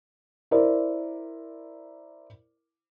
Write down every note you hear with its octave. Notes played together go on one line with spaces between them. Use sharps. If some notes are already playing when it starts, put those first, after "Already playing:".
E4 A#4 C5 D5